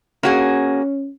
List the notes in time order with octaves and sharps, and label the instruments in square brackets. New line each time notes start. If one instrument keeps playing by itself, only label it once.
[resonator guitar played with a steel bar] A#3 F#4 G#4 [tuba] C#4